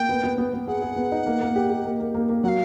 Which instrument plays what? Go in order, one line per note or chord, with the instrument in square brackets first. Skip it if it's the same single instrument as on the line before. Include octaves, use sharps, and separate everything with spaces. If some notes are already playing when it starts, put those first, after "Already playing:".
Already playing: [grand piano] A#3 [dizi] G5
[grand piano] B3
B3
B3
B3
[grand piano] G#4 [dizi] F#5
[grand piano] G#4
B3
D#4
A#3
A#3
G4
G4
A#3
A#3
A#3
A#3
[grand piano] F#3 [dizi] F5 F#5